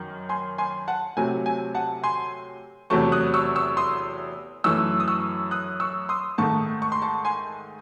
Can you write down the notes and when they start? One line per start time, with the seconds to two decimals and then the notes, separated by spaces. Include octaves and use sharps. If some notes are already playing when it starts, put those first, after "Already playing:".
Already playing: F#2 D#3
0.29 G#5 C6
0.58 G#5 C6
0.88 F#5 A5
1.17 C3 F#3 A3 G#5
1.46 G#5
1.75 F#5 A5
2.03 G#5 C6
2.90 E2 C3 F#3 A3 A5 C#6
3.12 D#6 F#6
3.34 C#6 E6
3.56 C#6 E6
3.77 C6 D#6
4.64 F#2 E3 A3 C#6 E6
5.00 D#6
5.08 C#6 E6
5.51 D#6 F#6
5.80 C#6 E6
6.09 C6 D#6
6.38 G#2 D#3 A3 A5 C#6
6.82 C#6
6.92 C6
7.02 A5 C#6
7.25 G#5 C6